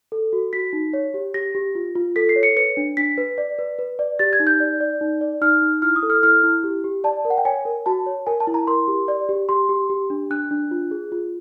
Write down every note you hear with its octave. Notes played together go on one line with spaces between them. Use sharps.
A4
F#4
F#4 B6
D#4
C#5
G4
G4 A#6
G4
F4
F4
A4 B6
C7
C#5
C#7
B4 C#7
D4
D4 B6
B4
D5
B4
B4
D5
G4 A6
G#6
D#4
G6
D5
D5
D#4
D5
D#4 F6
D#4
E4 F6
D#6
A4
F6
E4 F6
E4
G4
G4
D5 A5
A#4
F#5
G5
C#5 G#5
A#4
F#4 A5
C#5
A#4 G#5
A5
E4
A#5
A#4 C6
G4
D5
G4
G4 C6
G4
G4
D4
D4 F#6
D4
F4
G#4
F4